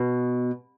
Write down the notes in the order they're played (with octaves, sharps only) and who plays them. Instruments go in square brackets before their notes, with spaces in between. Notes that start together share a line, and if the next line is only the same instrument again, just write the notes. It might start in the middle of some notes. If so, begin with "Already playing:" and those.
Already playing: [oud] B2